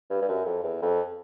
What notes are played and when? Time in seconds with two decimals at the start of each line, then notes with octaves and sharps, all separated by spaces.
0.10 G2
0.21 G2
0.28 F#2
0.45 F2
0.63 E2
0.82 F2